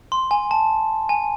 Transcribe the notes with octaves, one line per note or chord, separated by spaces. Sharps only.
C6
G#5
A5
G#5